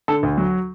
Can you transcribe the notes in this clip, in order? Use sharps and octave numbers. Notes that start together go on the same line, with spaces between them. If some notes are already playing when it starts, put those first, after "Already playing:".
D3 A4
D2
F#3